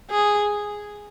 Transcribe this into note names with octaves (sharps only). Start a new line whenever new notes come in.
G#4